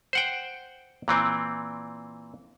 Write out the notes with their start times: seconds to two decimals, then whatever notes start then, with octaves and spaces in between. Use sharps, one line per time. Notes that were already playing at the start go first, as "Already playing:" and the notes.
0.13 C5 F#5 G5
1.08 A#2 E3 C4